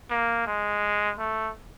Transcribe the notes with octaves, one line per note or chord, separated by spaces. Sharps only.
A#3
G#3
A3